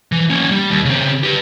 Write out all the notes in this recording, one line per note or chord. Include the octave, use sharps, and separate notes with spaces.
E3
A#3 C#4
G3
D#2
C#3 C4
G4 B4